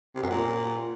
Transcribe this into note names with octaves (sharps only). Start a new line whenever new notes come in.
C3
F#2
A#2